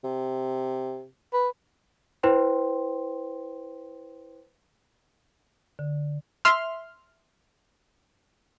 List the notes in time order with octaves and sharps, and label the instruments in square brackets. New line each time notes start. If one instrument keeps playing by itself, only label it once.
[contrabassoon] C3
[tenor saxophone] B4
[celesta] E4 B4 C5 G5 C6
[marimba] D3
[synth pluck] E5 C6 F6